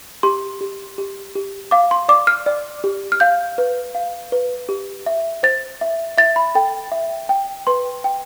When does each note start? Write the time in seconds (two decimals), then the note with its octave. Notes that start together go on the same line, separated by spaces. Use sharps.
0.23 G4 C6
0.61 G4
0.98 G4
1.35 G4
1.71 F5 D6
1.91 C6
2.09 D5 D6
2.27 F6
2.46 D5
2.84 G4
3.12 F6
3.20 F5 G6
3.58 B4
3.95 F5
4.32 B4
4.69 G4
5.06 E5
5.43 C5 A6
5.81 E5
6.18 E5 A6
6.36 B5
6.55 A4 G5
6.92 E5
7.29 G5
7.67 B4 C6
8.04 G5